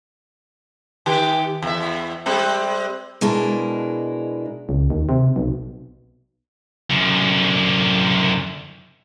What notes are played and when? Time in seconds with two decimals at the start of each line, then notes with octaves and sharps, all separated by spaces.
1.06 D#3 G4
1.62 E2 E5
2.26 G3 G#3 C4
3.21 B2 G#3 D4 E4 A#4
4.69 C#2
4.90 D#2
5.09 C3
5.36 B1
6.90 F#2 D3